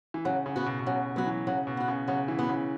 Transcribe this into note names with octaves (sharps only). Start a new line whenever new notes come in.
E3
C#3 F#3
C#3
B3 F#4
B2
B2
C#3 F#3
F#3 B3 F#4
E3
C#3 F#3
B2
B3 F#4
C#3
C#3 F#3
E3
B3 F#4
C#3